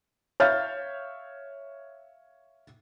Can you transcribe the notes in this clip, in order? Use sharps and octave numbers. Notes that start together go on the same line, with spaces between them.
C#5 E5 F5 F6 G6 A6